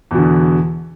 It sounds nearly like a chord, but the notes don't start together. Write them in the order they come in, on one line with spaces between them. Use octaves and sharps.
E2 B2 D3